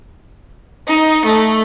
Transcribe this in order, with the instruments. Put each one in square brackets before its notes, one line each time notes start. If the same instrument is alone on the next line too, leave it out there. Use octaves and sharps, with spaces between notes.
[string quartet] D#4
A3